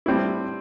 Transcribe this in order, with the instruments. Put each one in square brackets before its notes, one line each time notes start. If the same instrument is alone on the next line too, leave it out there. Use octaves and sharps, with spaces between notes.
[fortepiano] A2 G3 C4 E4